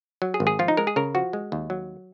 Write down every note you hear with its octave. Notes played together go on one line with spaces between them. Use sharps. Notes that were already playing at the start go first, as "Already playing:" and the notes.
F#3
G#4
G#1
G#4
F3 F4
D#4
G#3 A#4
G#4
C#3 A#4
F3 F#4
G#3
D#2
F#3